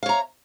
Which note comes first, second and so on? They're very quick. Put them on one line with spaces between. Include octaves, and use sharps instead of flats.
F5 C#5 A#5